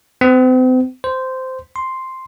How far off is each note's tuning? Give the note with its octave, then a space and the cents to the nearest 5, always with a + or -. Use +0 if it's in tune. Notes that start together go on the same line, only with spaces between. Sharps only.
C4 -40
C5 -10
C6 +0